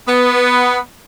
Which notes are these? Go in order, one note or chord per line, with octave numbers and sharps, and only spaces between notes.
B3